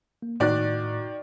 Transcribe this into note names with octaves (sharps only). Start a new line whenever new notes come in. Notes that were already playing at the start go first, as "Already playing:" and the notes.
A#3
A2 D#3 F#4 D5 F#6